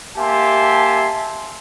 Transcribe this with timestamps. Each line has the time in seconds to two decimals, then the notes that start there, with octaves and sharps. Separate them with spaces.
0.17 A#3 G4 E5 G#5 A5 C6